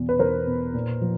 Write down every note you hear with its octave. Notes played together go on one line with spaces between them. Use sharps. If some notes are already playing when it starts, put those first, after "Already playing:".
Already playing: E2 B2
B4
E2 A#4 C5
B2
A#2
F3